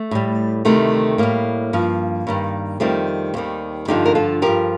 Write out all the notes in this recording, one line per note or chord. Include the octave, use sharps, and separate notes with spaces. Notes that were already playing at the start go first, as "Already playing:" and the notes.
Already playing: A3
A2 G3
D2 C3 D#3 G3 A3
A2 G3 A#3
G2 F3
G2 D#3 G3
F2 D#3 G3 A3 C4
D#2 D#3 G3
G2 D3 F3 D#4 G4
A#4
F4 A4
G2 F3 G4 A#4